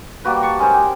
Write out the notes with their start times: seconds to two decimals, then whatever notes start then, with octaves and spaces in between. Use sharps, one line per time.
0.24 G3 A#3 F#4 B4
0.43 A5 C#6
0.59 G#3 C#4 A#4 C5
0.73 G4